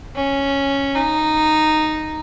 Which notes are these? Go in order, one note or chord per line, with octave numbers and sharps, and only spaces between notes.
C#4
D#4